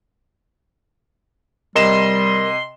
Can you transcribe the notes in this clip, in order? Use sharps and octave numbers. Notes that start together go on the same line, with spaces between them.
C3 G3 A#4 D#5 C6 E7